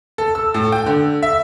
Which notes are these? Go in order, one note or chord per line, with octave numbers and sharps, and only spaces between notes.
A4
E6
A2
G5
D3
E5